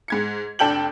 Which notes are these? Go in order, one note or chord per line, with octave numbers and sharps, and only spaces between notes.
G#2 G#6 C#7
F1 D4 A4 G5 G6 F#7